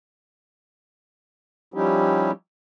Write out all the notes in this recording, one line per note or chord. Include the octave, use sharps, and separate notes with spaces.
F3 G3 C#4 D#4 E4 G4